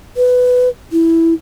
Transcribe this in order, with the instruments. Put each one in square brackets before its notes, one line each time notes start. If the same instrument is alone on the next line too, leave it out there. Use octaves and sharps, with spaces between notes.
[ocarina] B4
E4